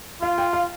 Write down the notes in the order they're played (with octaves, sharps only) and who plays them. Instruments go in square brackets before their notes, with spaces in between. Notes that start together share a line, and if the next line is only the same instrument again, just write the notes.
[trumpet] F4 [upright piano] F5
[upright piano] G5
F5